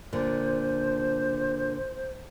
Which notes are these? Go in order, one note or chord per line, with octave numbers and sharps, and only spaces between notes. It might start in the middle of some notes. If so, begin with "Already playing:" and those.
A#2 D3 C5